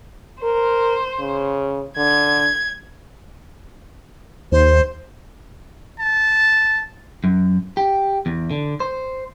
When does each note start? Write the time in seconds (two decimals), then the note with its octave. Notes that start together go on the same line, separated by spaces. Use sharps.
0.43 A#4 C5
1.19 C#3
1.97 D3 G#6
4.52 D#2 C5
5.99 A5
7.24 F#2
7.77 G4
8.26 E2
8.51 D3
8.80 C5